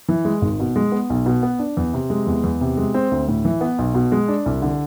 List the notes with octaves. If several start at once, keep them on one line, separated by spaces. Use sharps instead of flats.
E3
G#3
G#1
B2
G#3
B3
B1
B2
B3
D4
E2
C3
G#3
E2
E2
C3
G#3
C4
D2
A2
E3
B3
B1
B2
G#3
D4
C2
D3